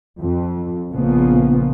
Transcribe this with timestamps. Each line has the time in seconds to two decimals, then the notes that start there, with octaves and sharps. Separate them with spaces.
0.20 F2
0.92 A#1 C#3 F3 A#3 B3